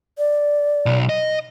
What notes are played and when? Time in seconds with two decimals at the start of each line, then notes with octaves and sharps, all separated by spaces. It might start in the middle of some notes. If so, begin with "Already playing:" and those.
0.18 D5
0.86 B1
1.09 D#5